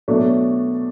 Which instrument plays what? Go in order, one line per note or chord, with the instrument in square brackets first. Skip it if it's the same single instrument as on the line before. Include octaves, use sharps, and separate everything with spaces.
[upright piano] B2 F#3 A3 D4